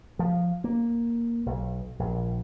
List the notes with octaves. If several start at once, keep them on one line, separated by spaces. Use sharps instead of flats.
F3
A#3
B1
A#1